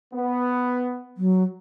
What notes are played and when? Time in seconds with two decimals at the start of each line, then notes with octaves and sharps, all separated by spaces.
0.14 B3
1.17 F#3